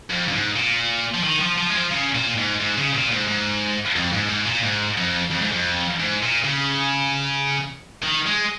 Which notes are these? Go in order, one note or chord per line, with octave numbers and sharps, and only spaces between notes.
F2
F2
G#2
A#2
F3
D#3
F3
F3
G#3
F3
C#3
A#2
G#2
G#2
C#3
A#2
G#2
G#2
F2
G#2
G#2
A#2
G#2
F2
F2
G#2
F2
G#2
A#2
C#3
D#3
G#3